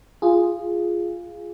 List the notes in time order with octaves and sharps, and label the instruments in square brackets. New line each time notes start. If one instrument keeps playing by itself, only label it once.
[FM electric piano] F4 G#4